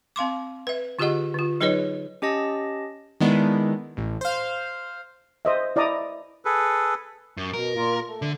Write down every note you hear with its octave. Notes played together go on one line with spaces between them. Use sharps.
C4 F5 C6 D6
B4 E5
D3 F4 G4 G#4 D#5 F#5
D3 F4
F#3 D#4 G#4 B4 C#5 D#5
C#4 G4 D#5 A5 A#6
D#3 G#3 B3 D4 E4
A1
C5 F5
C5 D#5 E5
E4 D5 D#5 A#5 D#6
G#4 A4 B4
F#2
B2 A#4
A#2 A#3 F4
A3
D3